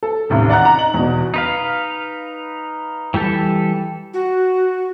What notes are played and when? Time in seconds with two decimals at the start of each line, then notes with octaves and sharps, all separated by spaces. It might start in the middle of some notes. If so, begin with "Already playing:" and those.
0.03 A4
0.30 A1 D#2 C3
0.50 D5 F#5 A#5 F#6
0.65 A#5
0.78 D#4 F#7
0.94 E2 B2
1.34 D#4 B4 F5
3.14 E3 G3 G4 A4
4.13 F#4